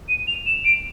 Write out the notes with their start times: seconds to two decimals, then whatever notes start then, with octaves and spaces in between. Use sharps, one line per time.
0.09 D#7
0.27 F7
0.46 E7
0.65 D7